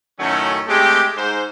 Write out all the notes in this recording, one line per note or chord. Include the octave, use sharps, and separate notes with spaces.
F#2 A2 D#3 F#3 A3 C#4
G#3 A3 C4 G4
G#2 C5